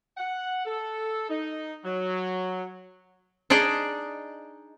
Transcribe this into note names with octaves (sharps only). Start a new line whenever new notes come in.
F#5
A4
D#4
F#3
D4 D#4 G#4 D5 D#5